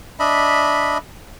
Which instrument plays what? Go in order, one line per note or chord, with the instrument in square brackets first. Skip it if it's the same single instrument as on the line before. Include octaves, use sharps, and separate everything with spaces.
[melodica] D4 D#5 E5 B5